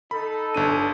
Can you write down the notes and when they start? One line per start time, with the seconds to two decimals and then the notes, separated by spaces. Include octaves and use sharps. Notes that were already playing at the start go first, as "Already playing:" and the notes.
0.11 D#4 A4 B5
0.55 G1 D4 D#7